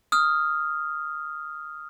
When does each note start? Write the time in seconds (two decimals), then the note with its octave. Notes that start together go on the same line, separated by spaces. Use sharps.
0.12 D#6 F6